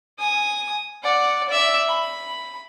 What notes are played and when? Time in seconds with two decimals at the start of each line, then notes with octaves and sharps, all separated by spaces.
0.19 G#5 D#6
1.03 D5 F#5
1.49 D5 E5
1.88 B5